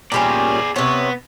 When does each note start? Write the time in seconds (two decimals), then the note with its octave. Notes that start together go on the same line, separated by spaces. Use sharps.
0.12 A#2 G3 C#4 G#4 D5
0.76 C3 B3 C#5